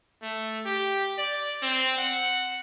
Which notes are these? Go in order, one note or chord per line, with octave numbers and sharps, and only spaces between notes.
A3
G4
D5
C4
F#5